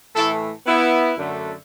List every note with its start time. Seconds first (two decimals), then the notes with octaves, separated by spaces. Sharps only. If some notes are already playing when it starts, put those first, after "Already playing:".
0.16 A2 E3 A3 E4 A4
0.66 B3 E4
1.18 F#2 D3 A3